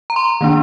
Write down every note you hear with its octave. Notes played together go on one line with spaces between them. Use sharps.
A#5
C6
D#3 A#3 D4